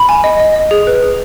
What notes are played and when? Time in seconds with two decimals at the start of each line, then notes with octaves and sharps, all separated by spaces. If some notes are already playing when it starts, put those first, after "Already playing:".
Already playing: B5
0.09 G#5
0.24 D#5
0.40 D#5
0.56 D#5
0.71 G#4
0.87 B4
1.02 G#4